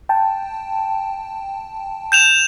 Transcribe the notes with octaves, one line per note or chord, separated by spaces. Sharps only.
G5 A5
G6 E7 F7